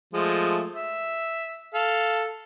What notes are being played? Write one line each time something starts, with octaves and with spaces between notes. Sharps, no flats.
F3 G#3 A3
E5
A4 F5